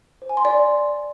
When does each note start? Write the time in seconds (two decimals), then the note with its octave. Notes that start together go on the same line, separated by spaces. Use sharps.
0.22 C5
0.29 G#5
0.37 C6
0.45 D5